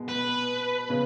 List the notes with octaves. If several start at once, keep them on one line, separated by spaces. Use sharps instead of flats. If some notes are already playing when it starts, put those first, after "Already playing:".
Already playing: B2 G#3 B3
B4
C#3 G#3 B3